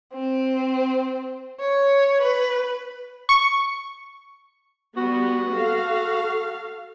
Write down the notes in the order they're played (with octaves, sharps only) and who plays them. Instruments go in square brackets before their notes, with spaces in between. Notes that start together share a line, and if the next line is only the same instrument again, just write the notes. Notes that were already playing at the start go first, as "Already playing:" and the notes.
[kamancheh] C4
C#5
B4
[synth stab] C#6
[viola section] G3 B3 [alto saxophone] F#4
[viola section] A4 F5